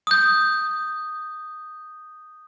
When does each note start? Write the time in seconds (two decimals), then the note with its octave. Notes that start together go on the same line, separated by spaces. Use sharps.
0.07 D#6 G6